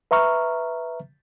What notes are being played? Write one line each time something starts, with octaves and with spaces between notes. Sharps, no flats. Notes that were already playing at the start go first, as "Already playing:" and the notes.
B4 E5 A#5 C#6 F6